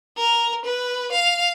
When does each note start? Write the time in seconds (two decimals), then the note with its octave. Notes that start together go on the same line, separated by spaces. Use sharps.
0.17 A#4
0.65 B4
1.12 F5